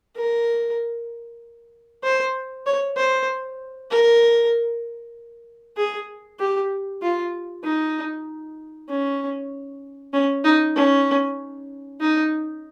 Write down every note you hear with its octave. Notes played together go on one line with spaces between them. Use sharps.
A#4
C5
C#5
C5
A#4
G#4
G4
F4
D#4
C#4
C#4
D#4
C#4
D#4